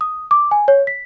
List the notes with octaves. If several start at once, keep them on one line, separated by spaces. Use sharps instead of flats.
D#6
D6
G#5
C#5
B6